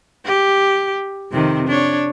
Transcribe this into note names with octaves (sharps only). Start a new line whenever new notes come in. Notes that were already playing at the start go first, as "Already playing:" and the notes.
G4
F2 C3 D#3
D4 C#5